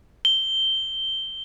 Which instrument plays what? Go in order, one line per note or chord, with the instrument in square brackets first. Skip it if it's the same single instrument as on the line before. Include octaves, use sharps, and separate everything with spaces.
[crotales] G7